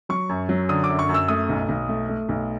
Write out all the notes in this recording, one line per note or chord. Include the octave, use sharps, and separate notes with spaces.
F#3 C#6
F#2
F#3
D3 D#6
D6
F#2
C#6
F#2
E6
A3 D#6
B1
B1
A3
A3
B1